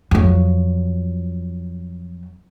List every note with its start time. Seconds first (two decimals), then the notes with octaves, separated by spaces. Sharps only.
0.11 F2 F#3